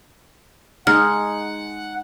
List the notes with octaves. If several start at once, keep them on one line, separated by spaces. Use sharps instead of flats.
G#3 D#4 F#5 F6